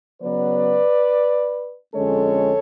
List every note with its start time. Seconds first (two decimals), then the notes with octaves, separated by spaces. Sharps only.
0.22 C#3 F#3 B3 B4 D5
1.95 F2 D3 G#3 C#4 A4 C#5